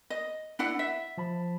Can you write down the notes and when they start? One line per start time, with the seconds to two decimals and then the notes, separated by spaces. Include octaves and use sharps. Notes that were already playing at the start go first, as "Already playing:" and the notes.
0.10 D#5
0.59 D4 E4 F#5
0.79 E5
1.18 F3 A5 B5